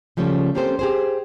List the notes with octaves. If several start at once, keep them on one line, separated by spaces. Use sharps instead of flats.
C#3 F3 G3 A3 C#4
A#3 C4 C#4 G4 A4 C5
G4 G#4 C5